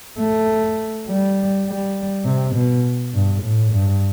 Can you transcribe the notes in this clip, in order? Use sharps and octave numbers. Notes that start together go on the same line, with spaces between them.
A3
G3
G3
C3
B2
G2
A2
G2